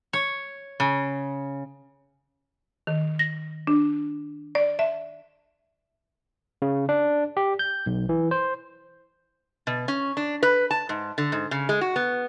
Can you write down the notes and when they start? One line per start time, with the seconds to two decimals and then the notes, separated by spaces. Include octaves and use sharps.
0.13 C#5
0.80 C#3
2.87 D#3
3.19 A#6
3.67 D4
4.55 D5
4.79 E5
6.62 C#3
6.89 D4
7.37 G4
7.59 G6
7.86 B1
8.09 E3
8.31 C5
9.67 B2
9.88 C#4
10.17 D4
10.43 B4
10.71 A5
10.89 G#2
11.18 D3
11.32 G#2
11.51 C#3
11.69 G#3
11.81 F#4
11.96 B3